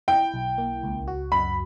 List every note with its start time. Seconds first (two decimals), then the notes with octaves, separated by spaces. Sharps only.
0.08 E4 G5
0.34 B1
0.58 A#3
0.83 C#2
1.07 F#4
1.32 F#2 B5